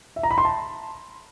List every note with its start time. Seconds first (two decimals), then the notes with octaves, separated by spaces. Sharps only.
0.16 E5
0.23 A#5
0.31 B5
0.38 C6
0.45 A5